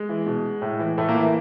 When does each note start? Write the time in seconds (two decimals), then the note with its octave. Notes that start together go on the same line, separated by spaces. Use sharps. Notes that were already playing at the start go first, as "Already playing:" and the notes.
Already playing: G#3
0.09 E3
0.26 B2
0.62 A2
0.79 E3
0.98 A2 A3
1.09 A#3
1.15 E3 E4